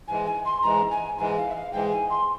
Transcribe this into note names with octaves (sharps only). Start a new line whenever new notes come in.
G#2 E3 G#3 G#5
G#5
C6
G#2 E3 G#3 A#5
G#5
G#2 E3 G#3 G#5
F5
E5
F5
G#2 E3 G#3 G5
G#5
C6